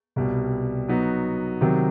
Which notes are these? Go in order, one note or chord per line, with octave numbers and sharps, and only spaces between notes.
C2 B2 G3
F#3 B3 D#4 F#4
C3 D#3 F#3